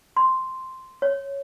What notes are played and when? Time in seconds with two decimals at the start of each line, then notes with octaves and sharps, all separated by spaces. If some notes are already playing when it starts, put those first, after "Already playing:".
0.17 C6
1.02 C#5